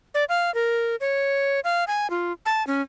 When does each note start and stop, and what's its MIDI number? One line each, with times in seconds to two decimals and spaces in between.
0.14 0.24 74
0.29 0.53 77
0.54 0.96 70
1.00 1.60 73
1.64 1.84 77
1.88 2.10 80
2.10 2.32 65
2.46 2.65 81
2.67 2.82 61